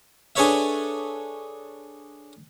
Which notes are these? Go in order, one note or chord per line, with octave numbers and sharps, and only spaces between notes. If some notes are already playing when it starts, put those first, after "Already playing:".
D4 G#4 A4 B4 C#5 E5